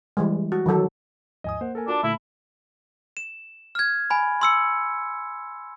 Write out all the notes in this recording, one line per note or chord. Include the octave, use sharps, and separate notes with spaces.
E3 G3 G#3
F#4
D#3 E3 F#3 A4
D#2 G#2 F3 D#5 G#5 D#6
A#3 C5 F#5
A4 A#4 G#5
D4 F4 F#4 A#4 A5
A#2 D3 A3 E4
E7
F6 G#6
G#5 B5
C6 E6 C#7